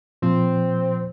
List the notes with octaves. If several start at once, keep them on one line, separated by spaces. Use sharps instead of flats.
A#2 F3 C4